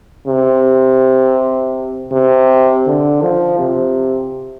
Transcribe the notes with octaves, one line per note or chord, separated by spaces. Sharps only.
C3
C3
D3
F3
C3